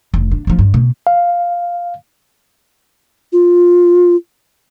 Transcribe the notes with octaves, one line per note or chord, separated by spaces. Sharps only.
F1
D4
F3 D4
G2
B2
F5
F4